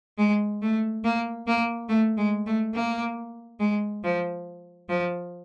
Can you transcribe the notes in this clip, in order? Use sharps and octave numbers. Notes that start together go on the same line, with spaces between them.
G#3
A3
A#3
A#3
A3
G#3
A3
A#3
G#3
F3
F3